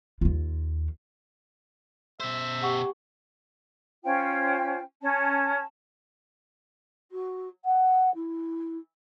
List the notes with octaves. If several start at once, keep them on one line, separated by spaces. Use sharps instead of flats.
D#2 F4
B2 C5 E5
G4 F#5 C#6
C#4 F4 C5 G5
C#4 A5
F#4
F#5
E4